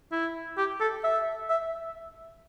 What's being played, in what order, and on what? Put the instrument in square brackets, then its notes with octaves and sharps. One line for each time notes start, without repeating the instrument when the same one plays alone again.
[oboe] E4
G4
A4
E5
E5